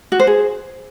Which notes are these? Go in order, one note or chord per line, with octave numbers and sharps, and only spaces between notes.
F#4
C5
G#4